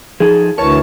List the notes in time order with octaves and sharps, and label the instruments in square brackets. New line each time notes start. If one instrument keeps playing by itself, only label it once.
[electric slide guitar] F3 D#4 A4 [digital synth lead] G#4
[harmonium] D2 E3 A5 [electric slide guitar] A#4 C#5 [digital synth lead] C#6